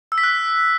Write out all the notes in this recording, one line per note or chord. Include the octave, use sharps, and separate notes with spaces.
E6
B6
F#6